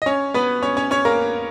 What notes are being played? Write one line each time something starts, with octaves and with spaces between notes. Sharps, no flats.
D#5
C#4 C#5
B3 B4
C#4 C#5
C#4 C#5
C#4 C#5
A#3 A#4